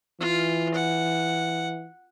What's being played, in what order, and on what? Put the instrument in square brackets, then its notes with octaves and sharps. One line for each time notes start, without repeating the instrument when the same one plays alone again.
[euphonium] E3 [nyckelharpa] F4
[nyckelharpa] F#5